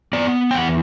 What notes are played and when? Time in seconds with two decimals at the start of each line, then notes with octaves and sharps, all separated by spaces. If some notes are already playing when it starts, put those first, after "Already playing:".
0.13 B3 D5
0.51 G5
0.54 E2 F#5